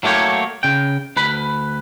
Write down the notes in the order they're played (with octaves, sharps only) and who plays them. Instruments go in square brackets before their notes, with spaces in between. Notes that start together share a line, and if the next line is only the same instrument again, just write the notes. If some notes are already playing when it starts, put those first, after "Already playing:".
[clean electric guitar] F#3 A3 A#3 G4 C#5
C#3 G5
D2 B4 B5